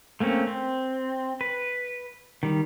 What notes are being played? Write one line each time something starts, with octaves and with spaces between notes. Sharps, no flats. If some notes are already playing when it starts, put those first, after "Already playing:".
A3 A#3 C4 C#4
C4
B4
D#3 G3